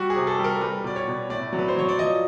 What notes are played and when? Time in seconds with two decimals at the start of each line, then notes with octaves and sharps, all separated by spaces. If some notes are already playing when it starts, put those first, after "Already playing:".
Already playing: G3 F#4
0.10 G#4
0.16 C3
0.27 A4
0.39 G3
0.44 A#4
0.61 G3 B4
0.84 B2 D5
0.96 C#5
1.08 B2
1.30 A2 D5
1.53 F#3
1.59 B4
1.68 C5
1.76 F#3 C#5
1.89 D5
1.98 F3 D#5